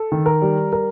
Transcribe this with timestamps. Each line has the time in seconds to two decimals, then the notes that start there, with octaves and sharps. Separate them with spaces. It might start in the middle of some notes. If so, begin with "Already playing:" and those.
Already playing: A4
0.12 D#3
0.26 A#4
0.42 G3
0.73 A#4